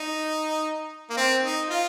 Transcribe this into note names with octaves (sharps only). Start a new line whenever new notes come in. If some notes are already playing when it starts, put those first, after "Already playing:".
Already playing: D#4
A#3
C4
D#4
F4